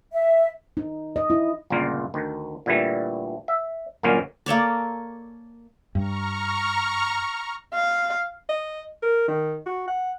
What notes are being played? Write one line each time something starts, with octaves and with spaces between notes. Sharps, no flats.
E5
D#4
D#5
E4
G1 C#2 A#2 A#3 A#4
D2 D#3
A#2 D3 E3 G3 A3
E5
G1 A#2 F#3 A#3 C#4 A#4
A#3 A4 C#5 D5
G2 A#5 C#6 F6
F5
D#5
A#4
D#3
F#4
F#5